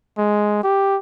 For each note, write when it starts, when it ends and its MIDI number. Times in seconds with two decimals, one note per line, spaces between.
0.18 0.61 56
0.64 0.97 67